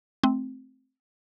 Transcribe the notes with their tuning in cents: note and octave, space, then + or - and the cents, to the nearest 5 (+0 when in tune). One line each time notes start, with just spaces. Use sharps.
A3 -15 C4 +0